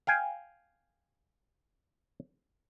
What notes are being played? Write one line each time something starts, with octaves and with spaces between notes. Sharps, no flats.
F5 G5 G#5